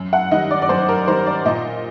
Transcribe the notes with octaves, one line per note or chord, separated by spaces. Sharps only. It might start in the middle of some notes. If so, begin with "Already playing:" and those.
Already playing: F#2
F#5
D#3 G3 D#5
D5
D5
F#2 C5
A#4
D#3 G3 C5
D5
A#2 D#5